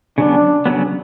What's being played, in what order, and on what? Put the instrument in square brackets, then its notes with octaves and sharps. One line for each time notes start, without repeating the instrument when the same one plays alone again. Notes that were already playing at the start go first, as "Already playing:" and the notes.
[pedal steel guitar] C#3 F#3 B3 [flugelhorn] D4
[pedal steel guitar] C#3 F#3 B3